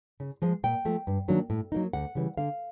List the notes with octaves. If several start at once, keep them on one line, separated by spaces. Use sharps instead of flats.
C#3
F3 G#3
A#2 G5
F3 A3
G2
D#3 F#3 A#3 D4
A2
F#3 A#3 D#4
D2 F#5
C#3 E3 G3
D3 F5